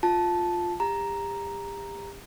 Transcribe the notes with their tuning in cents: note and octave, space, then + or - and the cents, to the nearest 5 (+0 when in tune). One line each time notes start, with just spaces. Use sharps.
F4 +10 A5 -5
G4 +35 A#5 +0